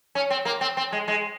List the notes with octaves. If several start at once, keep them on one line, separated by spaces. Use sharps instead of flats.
C#4
C4
A#3
C4
C4
G#3
G#3